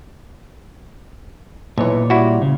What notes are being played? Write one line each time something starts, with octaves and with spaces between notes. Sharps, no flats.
B1 A#2 E3 C#5
G3 E4 F#4
C#3